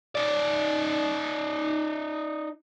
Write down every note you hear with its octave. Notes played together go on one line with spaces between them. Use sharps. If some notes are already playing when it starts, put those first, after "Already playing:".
D#4 D5